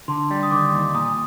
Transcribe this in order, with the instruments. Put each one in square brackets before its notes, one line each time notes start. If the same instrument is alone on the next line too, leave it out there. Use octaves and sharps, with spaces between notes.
[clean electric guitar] D3 [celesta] C6
[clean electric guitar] G3
[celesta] D#6
[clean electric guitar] D#3 [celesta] D6
[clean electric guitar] D#2
[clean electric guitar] A#2 [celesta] D#6